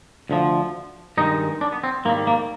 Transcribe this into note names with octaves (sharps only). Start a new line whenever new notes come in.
D2 D3 F3
G2 D#3 G#3 D#4
D4
B3
C4
G#2 D#3 G3 A#3
A#3